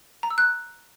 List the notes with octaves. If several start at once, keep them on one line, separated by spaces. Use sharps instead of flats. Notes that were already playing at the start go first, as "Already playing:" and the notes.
A#5
E6
F#6